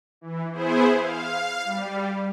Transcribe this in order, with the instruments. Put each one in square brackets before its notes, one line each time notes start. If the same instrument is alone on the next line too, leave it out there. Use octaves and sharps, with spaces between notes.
[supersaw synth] E3
B3 E4 G#4 C5
F5
G3